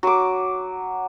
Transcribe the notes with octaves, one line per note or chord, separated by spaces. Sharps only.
F#3 D6